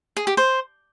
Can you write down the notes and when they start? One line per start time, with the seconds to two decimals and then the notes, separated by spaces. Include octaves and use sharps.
0.16 G#4
0.27 G4
0.37 C5